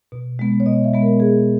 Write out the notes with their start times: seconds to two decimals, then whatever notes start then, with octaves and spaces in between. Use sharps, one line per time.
0.12 B2
0.39 G#3 B3
0.60 C#5
0.66 B2 D#5
0.84 E5
0.93 G#3 B3
1.02 A#4
1.20 B2 G#4